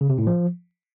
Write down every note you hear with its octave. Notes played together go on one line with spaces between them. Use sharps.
C#3
C3
A2
F3